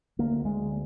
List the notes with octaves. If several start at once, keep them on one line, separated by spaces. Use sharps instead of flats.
D2 A#3
D2 G#3